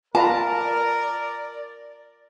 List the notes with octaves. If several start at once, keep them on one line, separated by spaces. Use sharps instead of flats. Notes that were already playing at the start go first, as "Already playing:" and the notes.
F4 A#4 B4 D5 A5 A#5